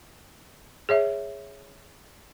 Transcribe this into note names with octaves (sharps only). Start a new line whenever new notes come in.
G#4 C#5 E5